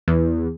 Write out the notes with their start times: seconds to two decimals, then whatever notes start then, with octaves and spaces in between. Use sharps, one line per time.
0.08 E2